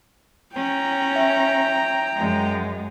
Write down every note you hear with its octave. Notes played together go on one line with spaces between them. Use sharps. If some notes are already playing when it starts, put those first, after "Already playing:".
C#4 G5 A#5
E5
F#2 G#3